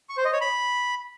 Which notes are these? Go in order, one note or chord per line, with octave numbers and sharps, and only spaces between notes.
C#6
C5
D#5
C#5
B5